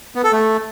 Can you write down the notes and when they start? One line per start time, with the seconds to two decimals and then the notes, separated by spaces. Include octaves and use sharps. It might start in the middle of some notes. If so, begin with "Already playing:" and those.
0.15 B3
0.24 A4
0.32 A3